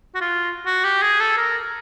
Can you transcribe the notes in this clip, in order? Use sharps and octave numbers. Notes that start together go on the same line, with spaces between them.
F#4
F4
F#4
G4
G#4
A4
A#4